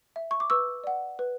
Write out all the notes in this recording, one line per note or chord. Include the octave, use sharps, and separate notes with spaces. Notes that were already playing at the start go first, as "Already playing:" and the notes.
E5
C#6
D6
B4 C#6 E6
D5 F#5
B4